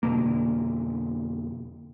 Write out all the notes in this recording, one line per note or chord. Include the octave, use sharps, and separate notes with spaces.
F2 B2 D3 A#3